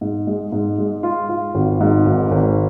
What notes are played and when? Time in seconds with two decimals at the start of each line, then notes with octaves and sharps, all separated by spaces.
0.01 G#2
0.27 G#3
0.52 G#2
0.78 G#3
1.03 F4
1.29 F4
1.55 G#1
1.80 G#2
2.06 G#1
2.31 G#1